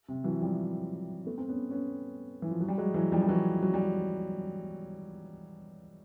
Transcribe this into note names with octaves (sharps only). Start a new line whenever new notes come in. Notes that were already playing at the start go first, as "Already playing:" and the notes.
C3
E3 F#3
F3 G3
A3 B3
C4
B3 C#4
B3 C#4
E3
F3
F#3
G3
F#3 G#3
E3 F#3
F3 G3
G3
E3 F#3
F#3
G3